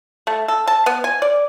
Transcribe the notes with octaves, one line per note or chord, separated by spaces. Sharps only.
A3
A4
A5
B3
G#5
D5